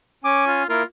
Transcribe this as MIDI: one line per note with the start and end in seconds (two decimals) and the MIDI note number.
0.24 0.63 61
0.24 0.63 80
0.24 0.46 86
0.47 0.66 65
0.69 0.83 58
0.69 0.83 64
0.69 0.83 65
0.69 0.83 70